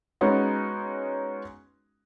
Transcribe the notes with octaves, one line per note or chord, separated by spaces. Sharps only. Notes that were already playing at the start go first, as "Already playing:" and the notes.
G#3 B3 C#4 D#4 F#4